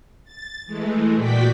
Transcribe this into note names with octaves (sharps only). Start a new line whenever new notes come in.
A6
E3 G#3 A3
A#2 F#4 D5 G5 B6